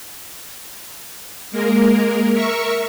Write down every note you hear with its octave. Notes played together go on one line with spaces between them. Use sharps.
G#3 A#3 A#4
A#4 E5 C#6